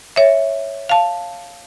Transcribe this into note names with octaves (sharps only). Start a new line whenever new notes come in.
C#5 E5
F5 A5